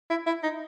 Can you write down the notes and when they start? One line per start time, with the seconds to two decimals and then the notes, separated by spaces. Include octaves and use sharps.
0.10 E4
0.27 E4
0.43 D#4